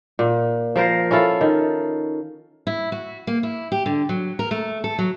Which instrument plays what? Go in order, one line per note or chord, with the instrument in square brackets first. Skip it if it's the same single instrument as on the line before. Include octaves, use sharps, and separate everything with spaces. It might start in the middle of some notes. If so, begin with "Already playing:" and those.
[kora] A#2
F3 A#4 C5
C#4 E4 F4 A4
D#3
[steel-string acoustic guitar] E4
F#4
A#3
E4
G4
D3
F#3
A#4
A3
A4
F#3